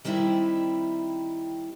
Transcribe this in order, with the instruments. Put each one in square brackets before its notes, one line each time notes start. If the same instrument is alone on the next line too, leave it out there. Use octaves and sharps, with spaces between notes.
[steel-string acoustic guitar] D#3 G3 C4 E4 D5 E5